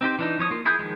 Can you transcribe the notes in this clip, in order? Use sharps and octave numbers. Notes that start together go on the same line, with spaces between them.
C4 D#4 G4 C5
E3 D4 D#4
E3 F3 C#5 D#6
A#3 F4
E4 G#4 B5 D#6 G6
D#3 F3 G#3